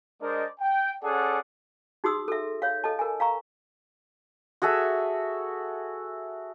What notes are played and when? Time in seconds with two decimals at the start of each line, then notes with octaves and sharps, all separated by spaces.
0.22 G#3 D4 A#4 C5 D5 D#5
0.60 G5
1.04 C#4 G#4 A4 D5 F#5
2.04 D#4 F#4 G#4 C6 D#6 E6
2.28 A4 E5
2.62 C#5 F5
2.84 A4 D#5 A5
2.99 A#4 G#5
3.20 F5 A#5 C#6
4.62 F#4 G#4 A4 E5